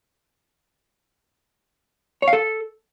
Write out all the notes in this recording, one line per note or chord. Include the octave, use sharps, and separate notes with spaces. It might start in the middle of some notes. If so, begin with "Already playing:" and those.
C#5
F5
A4